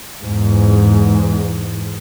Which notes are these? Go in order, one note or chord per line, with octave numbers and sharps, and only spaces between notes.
E2 G#2